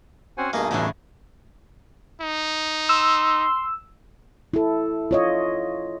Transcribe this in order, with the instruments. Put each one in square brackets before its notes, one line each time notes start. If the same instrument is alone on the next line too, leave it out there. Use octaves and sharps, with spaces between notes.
[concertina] C4 C#4 F#4 [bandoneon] C5 F#5 G#5
[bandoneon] G2 B2 [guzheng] A3 [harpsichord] A#3 G#4 [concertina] D#4 D#5 G#5
[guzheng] E2 A2 C#3 [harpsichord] A3 D4
[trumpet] D#4
[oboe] C6 [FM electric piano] E6
[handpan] E4 A4
F4 C#5 D#5